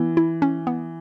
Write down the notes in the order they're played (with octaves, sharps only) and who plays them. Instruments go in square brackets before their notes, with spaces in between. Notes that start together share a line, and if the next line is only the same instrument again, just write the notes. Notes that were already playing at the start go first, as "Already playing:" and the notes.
Already playing: [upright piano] E3 [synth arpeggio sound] B3
[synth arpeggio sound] E4
C#4
B3